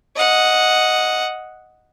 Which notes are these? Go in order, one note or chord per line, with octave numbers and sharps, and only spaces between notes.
D#5 F#5